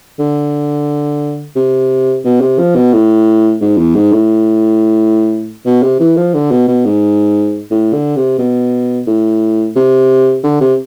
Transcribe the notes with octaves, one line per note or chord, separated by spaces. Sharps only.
D3
C3
B2
C3
F3
B2
A2
G#2
E2
G#2
A2
B2
C3
E3
F3
D3
B2
B2
G#2
A2
D3
C3
B2
A2
C3
D3
C3